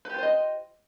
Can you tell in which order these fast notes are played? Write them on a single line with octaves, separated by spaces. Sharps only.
B4 G4 F4 C5 D#5